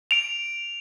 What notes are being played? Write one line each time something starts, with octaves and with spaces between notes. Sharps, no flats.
D7 F7